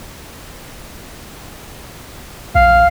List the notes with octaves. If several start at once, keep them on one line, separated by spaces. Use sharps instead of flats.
A#1 F5